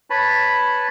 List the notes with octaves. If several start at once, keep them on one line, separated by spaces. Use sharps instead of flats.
B4 C#5 A5 B5